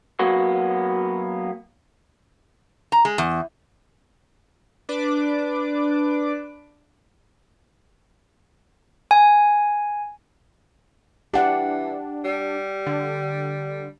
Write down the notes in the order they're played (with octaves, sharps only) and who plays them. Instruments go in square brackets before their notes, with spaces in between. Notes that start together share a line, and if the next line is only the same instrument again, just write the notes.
[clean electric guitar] F#3 A#3 B3 F#4
[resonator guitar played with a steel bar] A#5
G#3
E2
[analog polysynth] D4 B4 D6
[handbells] G#5
[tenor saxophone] E3 [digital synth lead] D4 [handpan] G4 F#5
[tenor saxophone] G3
[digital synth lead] D3